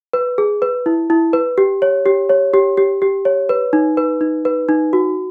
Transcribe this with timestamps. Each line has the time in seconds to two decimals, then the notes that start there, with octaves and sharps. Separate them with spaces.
0.13 B4
0.38 G#4
0.62 B4
0.86 E4
1.10 E4
1.33 B4
1.58 G4
1.82 C#5
2.06 G4
2.29 C#5
2.54 G4
2.77 G4
3.02 G4
3.25 C#5
3.49 B4
3.73 D#4
3.97 B4
4.21 D#4
4.45 B4
4.69 D#4
4.93 F#4